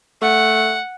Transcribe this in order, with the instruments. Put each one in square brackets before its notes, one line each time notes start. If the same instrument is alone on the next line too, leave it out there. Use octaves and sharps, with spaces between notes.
[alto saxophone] A3 [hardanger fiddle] F#5